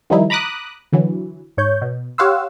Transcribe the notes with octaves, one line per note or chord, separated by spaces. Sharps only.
D#3 F3 G3 D#4 E4
A#5 B5 D6 D#6 F#6
D3 E3 F#3
G#2 C#5 G6
B2
G4 C#5 F5 F#5 C6 E6